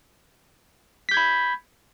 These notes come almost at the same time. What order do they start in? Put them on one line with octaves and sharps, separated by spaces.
B6 G6 G#6 B5